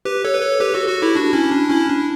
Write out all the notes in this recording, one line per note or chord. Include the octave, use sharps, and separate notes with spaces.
G4 B4
A4 C#5
B4
A4 C#5
G4 B4
F#4 A4
F#4 A4
E4 G4
D4 F#4
C#4 E4
D4
C#4 E4
D4